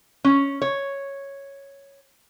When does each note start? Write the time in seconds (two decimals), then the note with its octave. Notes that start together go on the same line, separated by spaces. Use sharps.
0.24 C#4
0.62 C#5